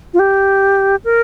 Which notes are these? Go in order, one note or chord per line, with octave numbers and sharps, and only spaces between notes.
F4
G4
A#4